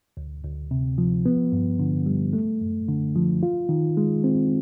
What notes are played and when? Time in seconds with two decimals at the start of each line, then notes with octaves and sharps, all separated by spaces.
0.17 D2
0.44 D2
0.71 C3
0.98 F3
1.26 B3
1.52 G2
1.79 D3
2.06 G3
2.33 A3
2.61 F#2
2.89 D3
3.16 F3
3.43 F4
3.69 D#3
3.97 G#3
4.24 C4